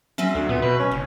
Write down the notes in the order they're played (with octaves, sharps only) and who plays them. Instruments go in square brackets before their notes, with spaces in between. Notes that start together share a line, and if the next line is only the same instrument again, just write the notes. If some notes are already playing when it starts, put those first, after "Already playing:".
[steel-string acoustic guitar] F#3 C4 E5 [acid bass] C#4
[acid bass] D2 [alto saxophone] D3
[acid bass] A#2 [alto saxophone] B3
[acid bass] B2 [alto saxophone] B4
[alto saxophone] C#4
[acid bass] F#1 [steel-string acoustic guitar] C#3